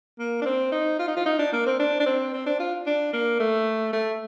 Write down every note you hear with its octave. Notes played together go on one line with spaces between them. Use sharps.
A#3
D4
C4
D#4
F4
D#4
F4
D#4
D4
A#3
C4
D4
D4
C4
C4
D4
F4
D4
A#3
A3
A3